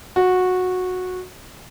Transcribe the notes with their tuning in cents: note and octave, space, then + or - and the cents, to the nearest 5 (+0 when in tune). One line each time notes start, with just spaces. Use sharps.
F#4 -15